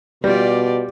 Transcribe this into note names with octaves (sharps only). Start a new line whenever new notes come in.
B2 G3 F4 G4 D5